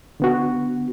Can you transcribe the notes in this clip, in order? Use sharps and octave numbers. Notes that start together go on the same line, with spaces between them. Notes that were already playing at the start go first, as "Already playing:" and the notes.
D3 B3 F#4